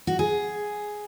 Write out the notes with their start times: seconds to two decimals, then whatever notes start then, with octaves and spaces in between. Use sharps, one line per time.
0.07 F#4
0.19 G#4